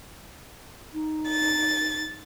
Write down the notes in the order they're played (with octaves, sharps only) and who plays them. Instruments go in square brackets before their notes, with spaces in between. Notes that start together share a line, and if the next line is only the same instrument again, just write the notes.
[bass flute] D#4
[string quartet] A6